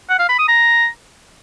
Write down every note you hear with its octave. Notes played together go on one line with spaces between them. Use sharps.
F#5
F5
B5
D#6
A#5